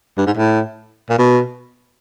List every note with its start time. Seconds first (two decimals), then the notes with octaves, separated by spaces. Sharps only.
0.18 G2
0.26 G#2
0.36 A2
1.10 A#2
1.19 B2